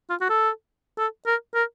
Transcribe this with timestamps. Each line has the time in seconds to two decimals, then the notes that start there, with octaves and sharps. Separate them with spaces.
0.10 F4
0.21 F#4
0.30 A4
0.98 A4
1.26 A#4
1.55 A#4